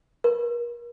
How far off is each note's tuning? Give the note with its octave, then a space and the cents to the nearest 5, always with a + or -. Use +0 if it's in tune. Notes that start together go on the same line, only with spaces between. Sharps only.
A#4 +35